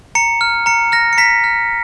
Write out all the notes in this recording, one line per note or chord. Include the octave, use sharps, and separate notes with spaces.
A#5 C#7
F6
A#5 C#7
F6 A#6
C#7
A#5 B6
F6